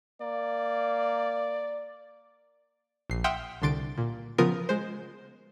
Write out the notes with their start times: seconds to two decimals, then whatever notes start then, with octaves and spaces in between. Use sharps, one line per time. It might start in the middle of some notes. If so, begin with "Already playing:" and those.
0.21 A#3 D5
3.10 A#1 C7
3.24 E5 F#5 G5 C6 D#6 F6
3.62 C2 D3 C6 A6 D7
3.98 A#2
4.38 C#3 F3 B3 F4 A#4 D#6
4.69 G#3 C5